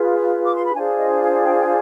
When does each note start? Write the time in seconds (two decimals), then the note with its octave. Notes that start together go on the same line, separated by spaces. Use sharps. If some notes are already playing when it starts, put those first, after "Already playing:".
Already playing: F4 G#4 B4
0.45 D6
0.55 C6
0.65 B5
0.75 D4 F4 G#4 C5 G#5
0.98 D#5
1.21 F5
1.44 G5
1.59 G5
1.66 G#5